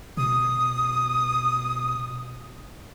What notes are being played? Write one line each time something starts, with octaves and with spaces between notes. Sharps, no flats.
B2 D#6